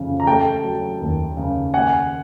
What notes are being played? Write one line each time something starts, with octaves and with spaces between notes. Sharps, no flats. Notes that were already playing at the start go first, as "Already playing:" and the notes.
Already playing: F2 C#3 E3
A#5
A3 G5 A5
F#3
D#2
C#3
A#3 F#5 G#5